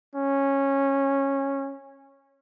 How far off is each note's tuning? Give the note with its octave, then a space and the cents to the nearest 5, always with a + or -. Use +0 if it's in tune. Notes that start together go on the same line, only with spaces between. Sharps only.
C#4 -15